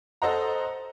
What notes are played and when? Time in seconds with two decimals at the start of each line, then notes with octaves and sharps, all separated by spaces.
0.22 A4 C5 D#5 F#5 A#5